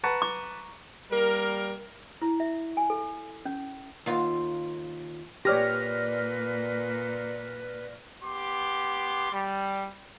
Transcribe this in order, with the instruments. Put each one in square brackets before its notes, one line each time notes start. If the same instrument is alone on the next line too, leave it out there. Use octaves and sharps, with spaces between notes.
[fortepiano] B4 F#5 A5 [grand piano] A#5 C#6 C#7
[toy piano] D6
[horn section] G3 A#3 A#4
[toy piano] E4
E5
G#5
A4
C#4
[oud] D#2 F4
[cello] A#2 [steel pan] G4 C#5 [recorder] B4 [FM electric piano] D5 F6 A#6
[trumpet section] B3 G4 C6 D6
G3